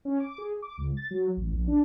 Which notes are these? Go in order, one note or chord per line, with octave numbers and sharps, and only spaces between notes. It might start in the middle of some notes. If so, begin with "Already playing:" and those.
C#4
D6
G#4
D6
C#2
A6
F#3
A1
A#1
D4